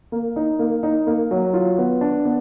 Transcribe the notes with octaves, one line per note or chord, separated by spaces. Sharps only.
A#3
D#4
A#3
D#4
A#3
F#3
F4
B3
D4
B3